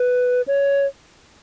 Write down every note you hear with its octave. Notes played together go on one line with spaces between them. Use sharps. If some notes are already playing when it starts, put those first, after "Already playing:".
Already playing: B4
C#5